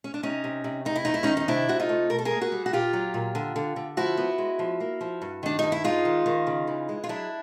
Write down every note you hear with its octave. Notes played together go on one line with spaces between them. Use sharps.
C#4
D4
C3 C#4 D#4
C3
C3
E2 D#4
E4
E2 D#4
E4
D#3 C#4 D#4
D#4
C3 D4 E4
C3 F#4
D#4 F4
A3
B2 A#4
A4
G#4 A#4
A#3
F#4 G#4
G3
F#4
A#2 F4 G4
F#3
A#2
D3
D3
D3
F3 E4 F#4
B3
G#3
F3
A#3
F3
G2
D#3 D4
G2 D#4
E4
G#3 D#4 F4
D#3
D#3
C#3
E3
G#3
F4
F#3 D4 E4